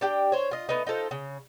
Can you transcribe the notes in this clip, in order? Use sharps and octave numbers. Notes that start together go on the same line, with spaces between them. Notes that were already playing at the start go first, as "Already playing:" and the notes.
D4 G4 G5
C5 C#5
F4 D#5
A3 B3 D#4
D#4 F4 A4 C5
C#3